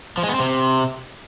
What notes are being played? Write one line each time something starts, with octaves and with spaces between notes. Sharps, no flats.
F3
G#3
B3
C4
C3